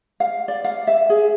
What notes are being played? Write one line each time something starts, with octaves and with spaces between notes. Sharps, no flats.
F5
D5
F5
E5
G#4